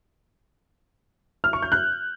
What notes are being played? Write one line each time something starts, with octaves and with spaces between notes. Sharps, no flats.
F6
C#6
G6
F#6